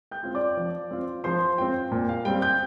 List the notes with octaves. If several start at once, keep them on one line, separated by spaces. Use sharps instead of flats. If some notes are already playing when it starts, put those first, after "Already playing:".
G5 G6
C4 F4
D5 D6
F3
C4 F4
F3 C5 C6
C4 F4 G5
A#2
F5
G3 C4 G5
G5 G6